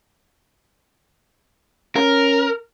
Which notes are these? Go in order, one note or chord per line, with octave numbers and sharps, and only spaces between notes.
C#4 A#4